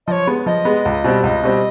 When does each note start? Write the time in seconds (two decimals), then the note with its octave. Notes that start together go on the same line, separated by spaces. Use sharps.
0.07 F3 C#5 D#5
0.27 G#3 B3
0.46 F3 D#5
0.65 G#3 B3
0.85 C#2
1.04 B2 G3 C4
1.23 C#2 D#5
1.43 B2 G3 C4